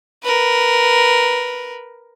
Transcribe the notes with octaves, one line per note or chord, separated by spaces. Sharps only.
A#4 B4